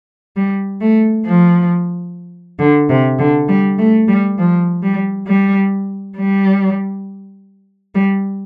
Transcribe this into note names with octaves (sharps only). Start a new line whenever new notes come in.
G3
A3
F3
D3
C3
D3
G3
A3
G3
F3
G3
G3
G3
G3